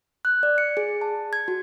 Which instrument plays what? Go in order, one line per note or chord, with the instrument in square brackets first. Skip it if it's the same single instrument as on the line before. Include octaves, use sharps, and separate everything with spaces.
[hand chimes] F#6
D5
C#7
G#4
A5
G#6
F#4